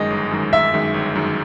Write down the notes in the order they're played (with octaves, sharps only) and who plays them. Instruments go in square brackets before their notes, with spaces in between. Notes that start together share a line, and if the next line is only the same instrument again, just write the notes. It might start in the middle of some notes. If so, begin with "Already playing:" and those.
Already playing: [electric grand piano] G1 F#2 D#3 G#3 [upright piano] D#5
[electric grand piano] G1
F#2 D#3 G#3
[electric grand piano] G1 [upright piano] E5
[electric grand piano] F#2 D#3 G#3
G1
F#2 D#3 G#3